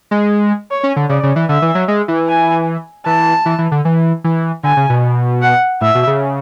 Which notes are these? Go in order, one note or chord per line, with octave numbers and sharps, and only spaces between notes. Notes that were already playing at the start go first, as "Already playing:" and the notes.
G#3
C#5
C#4
D3
C#3 D5
C#3
E3
D3 E5
E3
F#3
G#3
E3
G#5
E3 A5
E3
E3
D3
E3
E3
D3 G#5
C#3
B2
F#5
A2 E5
B2
C#3